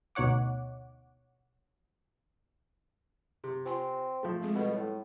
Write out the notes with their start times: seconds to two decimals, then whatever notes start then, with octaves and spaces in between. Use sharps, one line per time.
0.15 D2 B2 D#4 C#5 F#5 D6
3.44 C3
3.65 C4 F4 G#5 C6
4.23 F3 A3
4.42 G#3 C4 G#4
4.55 B2 G3 A4
4.74 A2